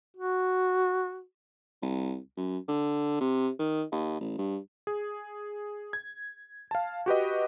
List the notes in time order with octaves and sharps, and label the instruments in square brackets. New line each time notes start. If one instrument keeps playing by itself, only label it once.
[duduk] F#4
[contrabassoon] C2
F#2
D3
C3
D#3
D#2
A1
G2
[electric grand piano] G#4
G#6
F5 A5
F#4 G4 B4 D#5